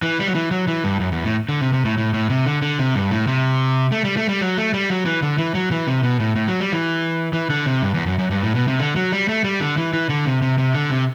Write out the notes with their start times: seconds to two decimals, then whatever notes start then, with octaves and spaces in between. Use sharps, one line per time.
0.02 E3
0.19 G3
0.27 F#3
0.35 E3
0.51 F#3
0.68 E3
0.84 G2
1.00 F#2
1.12 E2
1.24 A2
1.49 D3
1.61 C3
1.73 C3
1.85 A2
1.98 A2
2.14 A2
2.30 C3
2.46 D3
2.62 D3
2.79 C3
2.95 G2
3.11 A2
3.27 C3
3.92 A3
4.05 G3
4.17 A3
4.29 G3
4.41 F#3
4.57 A3
4.74 G3
4.90 F#3
5.06 E3
5.22 D3
5.38 E3
5.55 F#3
5.71 E3
5.87 C3
6.03 B2
6.20 A2
6.36 A2
6.48 F#3
6.60 G3
6.73 E3
7.33 E3
7.50 D3
7.66 C3
7.82 G2
7.94 E2
8.06 F#2
8.19 F#2
8.31 G2
8.43 A2
8.55 B2
8.68 C3
8.80 D3
8.96 F#3
9.12 G3
9.29 A3
9.44 G3
9.61 D3
9.77 E3
9.93 E3
10.09 D3
10.26 C3
10.42 C3
10.58 C3
10.74 D3
10.91 C3